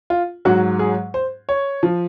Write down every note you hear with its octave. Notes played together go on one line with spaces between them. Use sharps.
F4
G#2 F#3 F#4
G#4
C5
C#5
F3